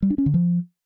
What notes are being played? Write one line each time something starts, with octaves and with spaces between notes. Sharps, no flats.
G3
D4
C#4
D3
F3